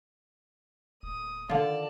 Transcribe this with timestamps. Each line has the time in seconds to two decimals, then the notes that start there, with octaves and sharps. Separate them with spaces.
1.03 D1 D#6
1.49 D3 D#3 F4 D5 A5